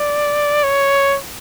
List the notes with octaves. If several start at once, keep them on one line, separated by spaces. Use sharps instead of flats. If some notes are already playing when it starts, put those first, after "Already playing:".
Already playing: D5
C#5